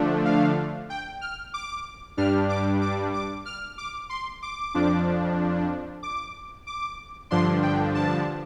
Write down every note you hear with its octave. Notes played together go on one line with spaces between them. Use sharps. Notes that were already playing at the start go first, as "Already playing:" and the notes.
Already playing: D3 F3 A3 D4
F5
G5
F6
D6
G2 G3 D4 F6
D6
D6
D6
F6
D6
C6
D6
F2 F3 D4
D6
D6
G2 D3 F3 D4 C6
G5
A5